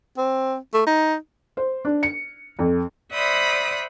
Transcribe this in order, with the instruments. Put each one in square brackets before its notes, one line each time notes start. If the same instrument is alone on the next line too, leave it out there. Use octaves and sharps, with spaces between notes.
[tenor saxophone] C4
A3
D#4
[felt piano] C5
D4
C#7
F2
[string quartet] C5 D5 E5 F#5 B5 D#6